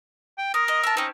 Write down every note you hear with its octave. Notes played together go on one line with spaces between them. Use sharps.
G5
A#4 D#6
D#5
E5 A5
C4 C#4 D#4